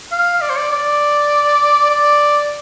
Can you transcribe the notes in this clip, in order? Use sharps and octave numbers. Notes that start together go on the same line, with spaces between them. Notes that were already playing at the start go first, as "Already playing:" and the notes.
F5
D5
C5
D5
D5
D5